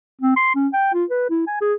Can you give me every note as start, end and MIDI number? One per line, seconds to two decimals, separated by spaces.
0.22 0.36 60
0.36 0.54 84
0.55 0.68 61
0.74 0.89 79
0.94 1.05 65
1.10 1.26 71
1.30 1.46 64
1.47 1.59 80
1.61 1.74 68